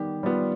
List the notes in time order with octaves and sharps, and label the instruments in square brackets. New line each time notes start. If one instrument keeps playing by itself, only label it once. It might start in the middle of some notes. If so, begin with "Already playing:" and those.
Already playing: [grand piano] D#3 G3 B3 [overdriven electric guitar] G4
[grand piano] G3 B3 F4